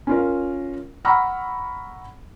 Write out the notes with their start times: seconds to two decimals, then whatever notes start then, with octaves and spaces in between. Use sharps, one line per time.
0.07 C#4 F4 A#4
1.05 F#5 A#5 B5 C#6 E6 F6